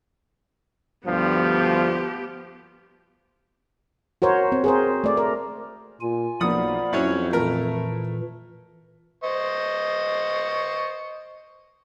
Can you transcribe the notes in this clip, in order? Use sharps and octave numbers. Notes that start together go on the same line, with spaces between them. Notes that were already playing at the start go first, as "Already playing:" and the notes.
D2 G2 F3 B3 G4
F#4 A#4 C5 C#5
C4
G#4 A#4 C5
A3 D5
A#4
A#2 F4 G#5
B1 F3 A#3 D5 F#5 B5 D#6
F2 F#3 C#4 E4 C5 C#5
A#2 E3 A3 A#4
C5 D#5 C#6